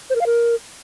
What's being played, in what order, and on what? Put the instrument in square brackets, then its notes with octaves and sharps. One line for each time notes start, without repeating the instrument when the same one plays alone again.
[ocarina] C5
A#4
F5
A#4